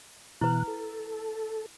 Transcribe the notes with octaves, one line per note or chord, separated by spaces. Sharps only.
B2 E3 E4 B4 F#6
A4